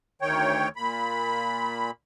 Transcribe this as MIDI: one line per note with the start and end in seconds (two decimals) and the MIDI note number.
0.22 0.69 38
0.22 0.69 51
0.22 0.69 73
0.22 0.69 79
0.76 1.91 46
0.76 1.91 83